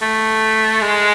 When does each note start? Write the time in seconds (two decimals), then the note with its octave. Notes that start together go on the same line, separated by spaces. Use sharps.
0.02 A3
0.81 G#3